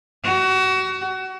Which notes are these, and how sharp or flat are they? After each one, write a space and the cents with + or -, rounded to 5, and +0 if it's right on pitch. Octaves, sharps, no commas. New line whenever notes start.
F#4 +30